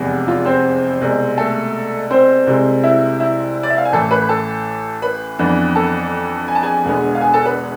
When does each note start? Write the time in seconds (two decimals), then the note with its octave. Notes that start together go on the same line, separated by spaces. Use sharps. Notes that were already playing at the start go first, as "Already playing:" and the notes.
Already playing: F1 E2 C3 G#3 B3
0.28 F4 F5
0.46 C4 C5
1.01 C2 B2 G#3
1.38 A3 A4
2.10 C4 C5
2.47 C2 C3 G#3 C4
2.83 E4 E5
3.20 E4 E5
3.63 D5
3.70 E5
3.78 F5
3.85 G#5
3.92 A1 A2 E3 A3 A4 A5
4.11 B4 B5
4.22 B5
4.29 A4 A5
5.02 B4 B5
5.39 F2 E3 B3 D4
5.75 A4 A5
6.48 G#5
6.55 A5
6.62 G#4 G#5
6.85 E1 E2 D3 G#3 B3
7.15 F5
7.21 G#4 G#5
7.33 A4 A5
7.45 B4 B5